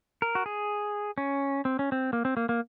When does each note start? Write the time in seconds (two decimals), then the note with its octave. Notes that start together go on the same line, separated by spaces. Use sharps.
0.22 A#4
0.35 F#4
0.46 G#4
1.18 C#4
1.65 C4
1.79 C#4
1.92 C4
2.13 A#3
2.25 C4
2.37 A#3
2.49 A#3